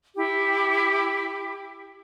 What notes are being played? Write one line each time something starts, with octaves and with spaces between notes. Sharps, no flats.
E4 G4